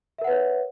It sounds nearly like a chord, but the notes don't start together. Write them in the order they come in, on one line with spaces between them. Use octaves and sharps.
E5 A#4 F#5 B4 C#5